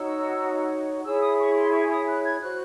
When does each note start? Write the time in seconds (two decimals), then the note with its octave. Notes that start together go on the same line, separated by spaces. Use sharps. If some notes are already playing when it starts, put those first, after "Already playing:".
Already playing: D#4 F#4 C#5 E6
1.04 E4 G#4 C#5 E6
1.22 D#6
1.39 C#6
1.56 C6
1.72 C#6
1.89 D#6
2.06 F#6
2.23 G#6
2.40 F#4 C5 F#6